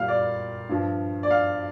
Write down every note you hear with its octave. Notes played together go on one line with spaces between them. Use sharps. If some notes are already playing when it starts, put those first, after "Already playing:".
Already playing: A#2 G3 F5
D5
G2 F3
D5
F5